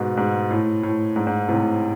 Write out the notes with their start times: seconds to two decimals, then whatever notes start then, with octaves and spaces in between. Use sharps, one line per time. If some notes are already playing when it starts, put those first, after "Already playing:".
Already playing: G#2 B2
0.17 G#2
0.51 A2
0.83 A2
1.16 G#2
1.27 G#2
1.48 A2 C3